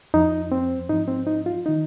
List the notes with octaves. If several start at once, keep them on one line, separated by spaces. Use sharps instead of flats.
F2 F3 D#4
C4
G#2 F3 D#4
C4
D#4
F4
D#3 D#4